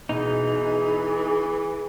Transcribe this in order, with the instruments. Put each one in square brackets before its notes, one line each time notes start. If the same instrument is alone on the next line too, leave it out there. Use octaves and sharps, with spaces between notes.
[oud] B2 [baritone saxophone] E3 [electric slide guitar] D#4 [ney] G#4